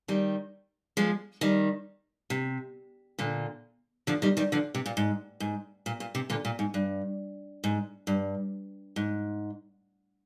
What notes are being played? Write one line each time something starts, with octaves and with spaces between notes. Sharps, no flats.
D#3 G3
F3 G#3
D#3 G3
C3
A#2 D3
D3 F3
D#3 G3
D#3 G3
D3 F3
C3
A#2
G#2
G#2
A#2
A#2
C3
A#2 D3
A#2
G#2
G2
G#2
G2
G#2